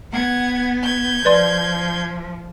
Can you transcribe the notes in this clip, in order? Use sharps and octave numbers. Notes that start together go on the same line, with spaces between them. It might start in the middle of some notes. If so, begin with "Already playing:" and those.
B3 F#5 G#6
G6 G#6
F3 B4 D5 C6